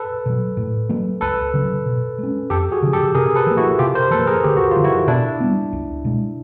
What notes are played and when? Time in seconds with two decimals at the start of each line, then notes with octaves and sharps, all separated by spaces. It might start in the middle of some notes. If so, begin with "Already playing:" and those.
Already playing: A4 B4
0.26 B2 F#3
0.57 A2
0.89 F#3 A#3
1.21 C#2 A4 B4
1.54 C#3 F#3
1.86 B2
2.18 G#3 C#4
2.50 F2 G4 A4
2.72 F#4 G#4
2.82 C#3 F3
2.93 G4 A4
3.15 C3 G#4 A#4
3.36 A4 B4
3.47 F3 A#3
3.57 E4 F#4
3.79 C3 F4 G4
3.95 A#4 C5
4.11 F3 A#3 A4 B4
4.27 G#4 A#4
4.44 D2 G4
4.57 F#4
4.71 F4
4.76 D3 F3
4.84 E4 F#4
5.07 B2 D4 E4
5.40 G3 B3
5.73 C#2
6.05 B2 G#3